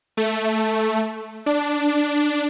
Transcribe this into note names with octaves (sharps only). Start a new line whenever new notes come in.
A3
D4